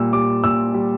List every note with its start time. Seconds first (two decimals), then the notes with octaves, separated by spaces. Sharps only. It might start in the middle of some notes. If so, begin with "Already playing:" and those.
Already playing: A#2 G3 E6
0.13 G3 D6
0.44 A#2 E6
0.74 G3